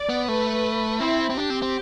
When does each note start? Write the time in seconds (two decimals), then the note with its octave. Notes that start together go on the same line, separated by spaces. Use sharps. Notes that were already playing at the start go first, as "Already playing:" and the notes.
Already playing: D5
0.09 B3
0.27 A3 B4
1.00 C4 E4
1.30 C4
1.38 D4 G4
1.50 C4
1.62 C4